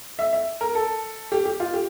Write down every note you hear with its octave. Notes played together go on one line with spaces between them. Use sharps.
E5
E5
A#4
A4
G4
G4
F4
G4